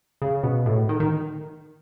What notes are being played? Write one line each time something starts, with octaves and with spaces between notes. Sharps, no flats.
C#3
B2
A2
D#3
D#3